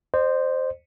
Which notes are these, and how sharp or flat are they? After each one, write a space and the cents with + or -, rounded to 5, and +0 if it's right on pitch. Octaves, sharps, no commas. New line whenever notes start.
C5 +0 D#5 -45